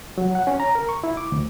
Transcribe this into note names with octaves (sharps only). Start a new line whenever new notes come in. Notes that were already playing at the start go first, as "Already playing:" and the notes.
F#3
F#5
C#4
A#5
A#4
C#6
E4
D6
D2